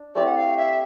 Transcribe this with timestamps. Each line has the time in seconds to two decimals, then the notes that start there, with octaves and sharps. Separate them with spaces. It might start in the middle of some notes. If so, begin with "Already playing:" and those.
Already playing: D4
0.15 A3 C4 E4 G4 D5
0.26 F#5
0.37 F5
0.57 E5